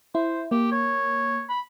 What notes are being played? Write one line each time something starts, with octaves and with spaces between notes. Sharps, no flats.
E4 C5
A#3 G4
C#5
B5